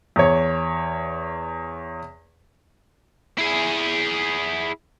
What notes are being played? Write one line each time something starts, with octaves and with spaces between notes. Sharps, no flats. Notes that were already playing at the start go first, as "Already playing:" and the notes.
E2 C#5
E4 G#4